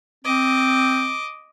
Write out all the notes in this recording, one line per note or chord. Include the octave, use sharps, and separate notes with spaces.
C4 D#5 D6